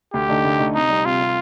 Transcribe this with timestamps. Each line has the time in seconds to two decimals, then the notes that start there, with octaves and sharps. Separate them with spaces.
0.13 D2 G4
0.29 D3 A3 D#4
0.45 D2
0.59 D3 A3 D#4
0.74 C3 D#4
0.90 G3 C4
1.05 C3 F4
1.20 G3 C4